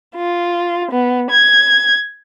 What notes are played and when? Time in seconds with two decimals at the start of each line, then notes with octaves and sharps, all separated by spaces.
0.16 F4
0.91 B3
1.31 G#6